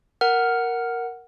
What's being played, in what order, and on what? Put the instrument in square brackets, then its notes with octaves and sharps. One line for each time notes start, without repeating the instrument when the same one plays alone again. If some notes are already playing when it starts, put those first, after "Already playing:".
[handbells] A#4 F#5 F6